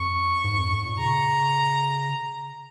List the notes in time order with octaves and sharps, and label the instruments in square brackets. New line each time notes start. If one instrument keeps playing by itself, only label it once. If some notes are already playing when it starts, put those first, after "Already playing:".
Already playing: [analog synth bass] F2 [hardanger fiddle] C#6
[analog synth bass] G#2
F2
G#2
A#2
[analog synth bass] C#3 [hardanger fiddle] A#5